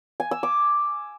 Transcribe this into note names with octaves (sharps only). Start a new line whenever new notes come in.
G#5
E6
D6